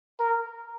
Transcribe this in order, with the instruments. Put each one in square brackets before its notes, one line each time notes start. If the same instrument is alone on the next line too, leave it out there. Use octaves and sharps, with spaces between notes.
[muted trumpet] A#4